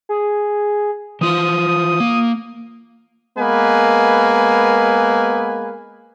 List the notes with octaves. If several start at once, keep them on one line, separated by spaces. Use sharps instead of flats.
G#4
E3 F4 C5 D#6
A#3
G#3 A#3 B3 B4 G#5